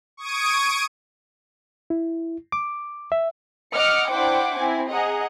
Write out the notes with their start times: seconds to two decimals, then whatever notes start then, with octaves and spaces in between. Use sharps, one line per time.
0.17 C#6 D#6 G#6 D7 D#7
1.90 E4
2.52 D6
3.12 E5
3.73 D#5 F#5 D6 F6 C#7
4.10 D4 E4 C5 F#5 G5 D6
4.59 C4 E4 G#5
4.91 G#4 D#5 F#5 A#5